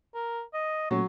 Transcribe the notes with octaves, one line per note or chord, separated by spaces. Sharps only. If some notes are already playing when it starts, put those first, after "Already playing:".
A#4
D#5
A#2 F#3 A3 C#4 C#5